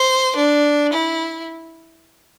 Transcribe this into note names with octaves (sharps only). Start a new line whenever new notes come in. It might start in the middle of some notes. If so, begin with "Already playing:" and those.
Already playing: C5
D4
E4